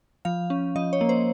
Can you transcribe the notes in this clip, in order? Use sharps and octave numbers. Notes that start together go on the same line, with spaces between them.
F3 F5
C#4
F3 D#5
C#5
A#3
C5